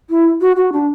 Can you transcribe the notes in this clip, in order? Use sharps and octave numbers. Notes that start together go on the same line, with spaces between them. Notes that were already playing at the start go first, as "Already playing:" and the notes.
E4
F#4
F#4
D4